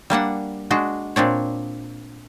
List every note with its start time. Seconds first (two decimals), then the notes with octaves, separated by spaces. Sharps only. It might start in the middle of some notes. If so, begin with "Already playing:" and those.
0.10 G3 A#3 D4 F#5
0.71 G#3 D4 F#4
1.16 A#2 C4 D4 C#5